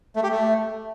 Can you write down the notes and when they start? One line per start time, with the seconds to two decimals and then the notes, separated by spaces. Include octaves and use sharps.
0.16 A3
0.23 G4
0.31 A3